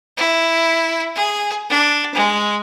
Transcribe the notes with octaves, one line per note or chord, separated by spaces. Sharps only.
E4
G#4
D4
G#3